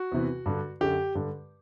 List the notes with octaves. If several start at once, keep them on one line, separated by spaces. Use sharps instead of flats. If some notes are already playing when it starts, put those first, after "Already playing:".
Already playing: F#4
E2 C3 E3
G2 D3
F#2 D3 G4
G2 D3